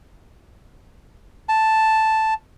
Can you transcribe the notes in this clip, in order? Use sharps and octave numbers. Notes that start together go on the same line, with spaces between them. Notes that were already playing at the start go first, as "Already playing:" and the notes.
A5